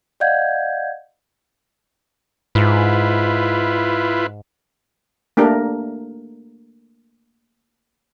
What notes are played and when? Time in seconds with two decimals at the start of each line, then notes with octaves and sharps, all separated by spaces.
0.20 D5 D#5 F5 F#5 G6 G#6
2.55 G#2 E4 F4 B4
5.37 A3 A#3 D4 G4 A#4